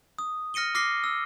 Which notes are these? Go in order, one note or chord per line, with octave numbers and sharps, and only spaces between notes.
D#6
F6 A#6 C#7 D#7 G7
D6 F6 A#6 C7 G7
E6